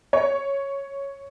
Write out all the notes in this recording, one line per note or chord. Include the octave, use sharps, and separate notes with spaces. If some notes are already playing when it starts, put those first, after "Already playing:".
C#5